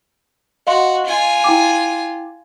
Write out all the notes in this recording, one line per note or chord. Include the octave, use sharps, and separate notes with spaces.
F#4 D#5 F5 C6
F4 G#5
E4 G5 D6